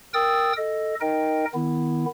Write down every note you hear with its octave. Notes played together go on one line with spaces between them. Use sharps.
A#4 G5 D#6 E6 A6
A4 D#5
D#4 A#4 D#5 G5
D#3 B3 E4